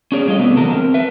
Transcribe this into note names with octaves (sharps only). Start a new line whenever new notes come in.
C#4 D4 G#4 C#5 D5
A2 G3 F4 D#5
C3 A3 B3 C4 D4
E2 D3 F#3 G#3 A#4 A5
C4 A#4
B4 E5